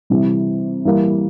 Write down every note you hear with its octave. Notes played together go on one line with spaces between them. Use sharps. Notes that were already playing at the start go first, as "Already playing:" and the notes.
C3 E3 G3
E3 G3 A#3